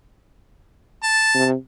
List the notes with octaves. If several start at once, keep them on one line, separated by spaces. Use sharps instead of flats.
A5
C3